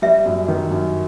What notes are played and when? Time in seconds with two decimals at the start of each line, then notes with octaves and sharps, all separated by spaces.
0.02 G3 E5
0.26 F#2
0.48 D#3
0.71 F#2